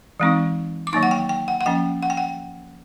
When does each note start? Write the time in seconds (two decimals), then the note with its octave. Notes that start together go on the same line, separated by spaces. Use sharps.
0.20 E3 G#3 C4 D#4
0.87 D6
0.93 D#3 F#3 A#3 D#4 C#6
1.03 F#5
1.11 G5
1.29 G5
1.48 F#5
1.61 F#5
1.66 F3 A#3 C#4 G5
2.03 F#5
2.10 G5
2.17 F#5